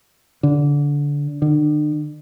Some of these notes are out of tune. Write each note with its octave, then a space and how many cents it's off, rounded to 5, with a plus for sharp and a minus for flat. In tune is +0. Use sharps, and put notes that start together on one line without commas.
D3 -20
D3 +40